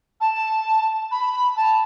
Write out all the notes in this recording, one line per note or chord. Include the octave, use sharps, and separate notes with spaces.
A5
B5
A5